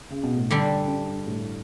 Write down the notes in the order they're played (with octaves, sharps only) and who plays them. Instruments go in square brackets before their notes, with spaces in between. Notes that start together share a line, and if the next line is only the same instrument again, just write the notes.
[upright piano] C#3
B2
A2
[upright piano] G2 [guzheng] D3 G3 D4
[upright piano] G2
A2